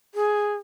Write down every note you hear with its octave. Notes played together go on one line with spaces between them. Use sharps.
G#4